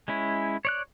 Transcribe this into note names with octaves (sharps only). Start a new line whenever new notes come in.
G#3 C#4 E4
C#5 D5 F#6